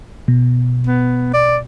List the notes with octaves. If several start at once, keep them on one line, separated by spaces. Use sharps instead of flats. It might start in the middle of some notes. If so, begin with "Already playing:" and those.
B2
B3
D5